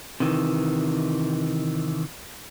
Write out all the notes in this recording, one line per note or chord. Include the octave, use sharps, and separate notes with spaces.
C3 D#3 E3